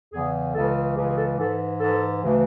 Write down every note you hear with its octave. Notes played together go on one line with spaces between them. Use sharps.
E2 C#3 E3 G#4
C#2 C#3 E3 A4
C#2 C#3 E3 G#4
G#4
A4
G#2 E3 A4
G#2 E3 A4
D2 C#3 E3